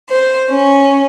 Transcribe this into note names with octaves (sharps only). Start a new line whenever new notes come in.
C5
C#4